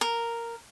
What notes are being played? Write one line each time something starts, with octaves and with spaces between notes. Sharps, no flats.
A#4